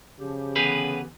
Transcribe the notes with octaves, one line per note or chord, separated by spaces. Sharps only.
C#3 F3 G4
D3 E3 B3 G4 G#4 B4